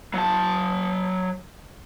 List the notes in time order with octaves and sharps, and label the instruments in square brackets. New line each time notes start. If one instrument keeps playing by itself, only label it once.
[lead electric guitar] F#3 A5